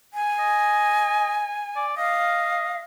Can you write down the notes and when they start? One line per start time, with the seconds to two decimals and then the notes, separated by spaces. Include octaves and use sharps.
0.14 G#5
0.39 D#5
1.76 D5
1.97 D#5 F5